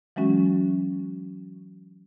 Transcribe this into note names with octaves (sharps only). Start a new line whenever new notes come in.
E3 F#3 G#3 C#4 F#4